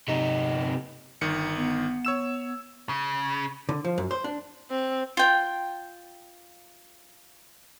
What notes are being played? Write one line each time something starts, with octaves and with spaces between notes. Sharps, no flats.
C3 D#4
G1 D#3 C#7
B3
C#5 E6 E7
C#3
D3
F3
F#2
C5
D4
C4
F4 G5